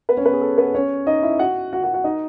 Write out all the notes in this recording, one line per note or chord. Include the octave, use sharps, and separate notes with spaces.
B3 B4
C#4 C#5
B3 B4
G#4
A4
B3 B4
C#4 C#5
D#4 D#5
E4 E5
F#4 F#5
F#4 F#5
F#4 F#5
F#4 F#5
D#4 D#5